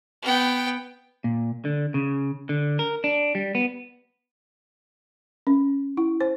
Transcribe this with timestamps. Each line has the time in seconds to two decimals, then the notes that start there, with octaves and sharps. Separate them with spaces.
0.23 B3 G5
1.24 A#2
1.65 D3
1.94 C#3
2.49 D3
2.79 A#4
3.04 D4
3.35 G3
3.55 B3
5.47 C#4
5.97 E4
6.21 C5